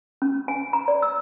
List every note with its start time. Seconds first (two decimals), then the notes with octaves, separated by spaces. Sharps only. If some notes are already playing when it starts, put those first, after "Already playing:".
0.22 C#4
0.48 G#5
0.73 A#5
0.88 D5
1.02 E6